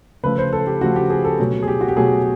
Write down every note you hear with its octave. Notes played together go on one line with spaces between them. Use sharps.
C#3 F3 A3 B4
C5
A4
G4
C#3 F3 A3 F#4
G4
G#4
A4
B2 F#3 A3
G#4
G4
F#4
G4
B2 F#3 A3 G#4